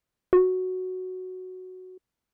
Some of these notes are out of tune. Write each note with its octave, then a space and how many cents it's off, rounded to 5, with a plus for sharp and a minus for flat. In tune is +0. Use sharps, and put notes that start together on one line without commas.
F#4 +0